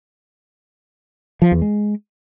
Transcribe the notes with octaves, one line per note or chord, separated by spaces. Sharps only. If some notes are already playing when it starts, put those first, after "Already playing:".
F3
E2
G#3